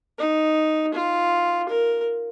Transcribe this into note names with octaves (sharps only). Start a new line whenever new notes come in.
D#4
F4
A#4